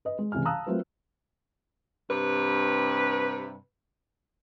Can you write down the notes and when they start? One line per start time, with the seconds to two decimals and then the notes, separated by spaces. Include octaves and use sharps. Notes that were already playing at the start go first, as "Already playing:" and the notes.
0.05 B4 D#5
0.19 G#3
0.32 C2 C#3 E3 G#4 G#5 F6
0.45 F5 A5 A#5 D#6 E6 F#6
0.67 F#3 A3 C4 F4 A#4 B4
2.08 G2 C3 B4